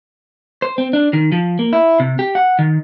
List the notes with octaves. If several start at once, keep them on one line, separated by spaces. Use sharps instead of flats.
C5
C4
D4
D#3
F3
A#3
E4
C3
G4
F#5
D#3